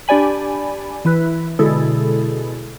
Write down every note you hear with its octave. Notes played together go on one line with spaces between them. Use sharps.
D4 G4 D5 G#5 B5
E3 E4 B4
B2 D3 G#3 E4 G#4 A4